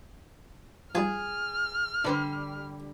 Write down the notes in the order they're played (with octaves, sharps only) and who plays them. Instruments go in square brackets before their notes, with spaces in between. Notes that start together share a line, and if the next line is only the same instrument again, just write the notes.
[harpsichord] F3 G3 D#4 [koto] G#4 [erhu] F6
[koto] D3 G3 [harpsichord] D4 B4 C5